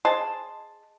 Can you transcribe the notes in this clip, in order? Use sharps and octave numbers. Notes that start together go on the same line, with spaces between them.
G#4 C5 D#5 A5